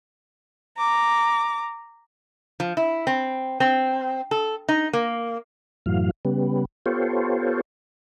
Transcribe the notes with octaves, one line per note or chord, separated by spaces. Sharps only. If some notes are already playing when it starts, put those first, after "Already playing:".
A#5 D6
F3
E4
C4
C4
A4
D#4
A#3
F#2 A2 E3 F#3 F5
C#3 G3 B3
B3 F4 G4 A4 C5 C#5